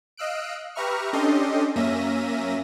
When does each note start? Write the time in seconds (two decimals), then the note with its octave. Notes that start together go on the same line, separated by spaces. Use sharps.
0.17 D#5 F5 E6 F#6 D7
0.75 G4 B4 E5 A#5 C#6 F6
1.13 C#4 D4 G4 A4 D#5 C6
1.76 F#2 A#3 C#4 E5 A#6 D#7